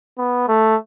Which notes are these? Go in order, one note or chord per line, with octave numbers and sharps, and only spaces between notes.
B3
A3